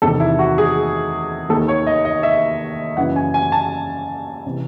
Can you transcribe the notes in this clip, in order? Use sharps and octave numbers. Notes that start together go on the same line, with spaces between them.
E2 C3 D#3 A4
E4
F#4
G#4
D#2 D#3 A4
C#5
D#5
D#5
E5
F#2 C#3 E3 F#5
G#5
G#5
A5
C3 E3